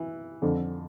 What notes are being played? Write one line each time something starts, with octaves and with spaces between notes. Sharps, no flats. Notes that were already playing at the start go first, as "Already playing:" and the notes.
Already playing: E3
F2 D3